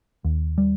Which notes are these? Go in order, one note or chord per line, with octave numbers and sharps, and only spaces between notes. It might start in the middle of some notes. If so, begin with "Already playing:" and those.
D#2
G3